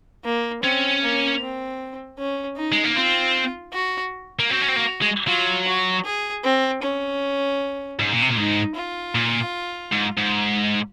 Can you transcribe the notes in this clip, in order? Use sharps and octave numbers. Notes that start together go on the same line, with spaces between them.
A#3
C4 C#4
A#3
C4
C#4
D#4
G#3
A#3
C4 F4
F#4
A#3
C4 F#4
C#4
C4
A#3
G#3
F#3 F4
F#4
G#4
C4
C#4
G#2
A#2
C3
A#2
G#2 D#4
F4
A#2
G#2
G#2